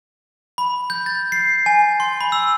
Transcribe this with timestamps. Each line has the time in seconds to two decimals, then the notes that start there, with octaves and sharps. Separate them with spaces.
0.58 B5
0.90 G6
1.06 A6
1.32 C7
1.66 G#5
2.00 C6
2.20 B5
2.32 E6